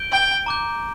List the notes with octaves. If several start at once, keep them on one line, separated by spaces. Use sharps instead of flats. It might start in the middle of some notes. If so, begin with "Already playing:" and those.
Already playing: G6 D7 G7
G5
A#5 D6 G6